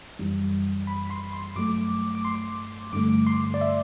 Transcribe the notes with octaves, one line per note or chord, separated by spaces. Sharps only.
F#2 E3 G3
B5
C6
C6
G2 F#3 A3 D6
D6
C6
G2 D3 A3 D6
C6
D5
E5